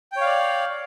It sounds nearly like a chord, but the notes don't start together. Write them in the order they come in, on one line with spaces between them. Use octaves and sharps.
G5 C#5 F5 D5